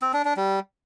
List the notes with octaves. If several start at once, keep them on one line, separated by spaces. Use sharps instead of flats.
C4
D4
D4
G3